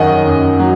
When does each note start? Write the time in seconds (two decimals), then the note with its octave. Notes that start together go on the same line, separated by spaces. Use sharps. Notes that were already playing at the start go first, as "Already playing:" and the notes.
Already playing: F#2 D#3 F#3 C#5 D#5 F#5 G#5
0.26 F#2
0.59 F#3